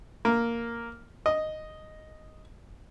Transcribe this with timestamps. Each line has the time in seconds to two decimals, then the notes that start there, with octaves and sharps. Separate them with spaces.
0.25 A#3
1.26 D#5